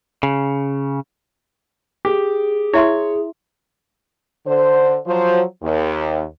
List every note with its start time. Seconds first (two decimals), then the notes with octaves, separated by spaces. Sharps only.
0.23 C#3
2.05 G4 G#4
2.74 E4 C#5 E5 C6
4.47 D3 C5
5.06 F3 F#3 C5
5.63 D#2